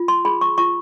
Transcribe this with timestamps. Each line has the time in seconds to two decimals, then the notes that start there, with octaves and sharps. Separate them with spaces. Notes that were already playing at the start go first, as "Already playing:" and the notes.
Already playing: F4
0.08 C6
0.25 G#4 B5
0.41 C#6
0.58 F4 C#6